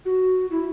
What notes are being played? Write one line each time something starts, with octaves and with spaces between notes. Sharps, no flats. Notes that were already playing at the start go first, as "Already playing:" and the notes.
F#4
E4